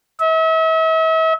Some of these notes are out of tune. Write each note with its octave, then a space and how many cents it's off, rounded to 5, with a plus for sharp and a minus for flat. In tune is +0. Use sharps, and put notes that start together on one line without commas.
E5 -40